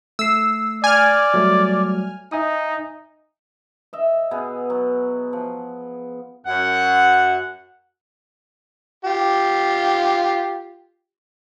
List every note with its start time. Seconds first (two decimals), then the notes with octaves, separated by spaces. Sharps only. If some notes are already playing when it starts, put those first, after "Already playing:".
0.19 A3 E6 C7
0.84 D5 G#5 F6
1.34 F#3 G3 A3
2.32 D#4 E5 G#5 D#6
3.93 D#5 E5
4.31 B2 B3 G#4
4.70 F#3
5.33 F3
6.47 F#2 F#5
9.05 F4 G4